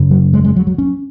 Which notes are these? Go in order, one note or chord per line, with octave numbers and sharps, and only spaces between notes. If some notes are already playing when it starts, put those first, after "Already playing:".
Already playing: F#2 C#3
F#3
G#3
G#3
F#3
F#3
C#4